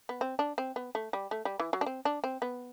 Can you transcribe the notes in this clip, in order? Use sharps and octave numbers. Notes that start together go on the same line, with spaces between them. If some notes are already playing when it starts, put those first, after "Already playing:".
B3
C4
D4
C4
B3
A3
G3
A3
G3
E3
F#3
D4
C4
D4
C4
B3